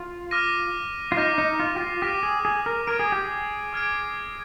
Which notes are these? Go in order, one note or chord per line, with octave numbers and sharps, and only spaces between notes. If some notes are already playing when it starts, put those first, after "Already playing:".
Already playing: F4
D6 F6 A#6 D#7
F4
D#4 D6 F6 A#6 D#7
D#4
F4
G4
F4
G4 D6 F6 A#6 D#7
G#4
G#4
A#4
A#4 D6 F6 G#6 D7
G#4
G4
G#4
D6 F6 G#6 D7